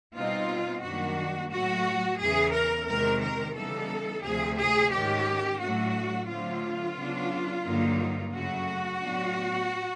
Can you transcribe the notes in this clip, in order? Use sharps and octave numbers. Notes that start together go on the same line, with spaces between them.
B2 G3 C4 D#4 F4
F#2 D#3 G3 A#3 D4 F#4
A2 F#3 A3 F#4
E2 C#3 E3 G#4
A#4
E2 C3 D#3 G#3 C4 A#4
A#4
C#3 E3 G3 B3 D#4 A4
D2 C3 F3 A3 G#4
G#4
G#2 D#3 G#3 C#4 G4
A2 F#3 A3 D4 F#4
D3 F#3 A3 C4 F4
C#3 F#3 B3 D4
G2 D3 F#3 A#3 D#4
F#2 C#3 F#3 A3 F#4
A2 F#3 B3 D4